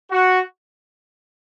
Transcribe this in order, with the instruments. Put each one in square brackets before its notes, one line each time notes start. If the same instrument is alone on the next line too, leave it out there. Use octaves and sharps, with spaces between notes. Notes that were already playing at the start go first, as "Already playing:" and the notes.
[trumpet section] F#4